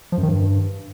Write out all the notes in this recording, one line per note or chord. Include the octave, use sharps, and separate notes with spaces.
F3
F#2
D#3
G2